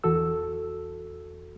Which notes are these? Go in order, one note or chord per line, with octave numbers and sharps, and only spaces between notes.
E2 E3 F#4 A4 E6